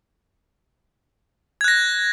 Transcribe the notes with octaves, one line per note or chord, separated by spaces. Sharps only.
F#6 G#6 A#6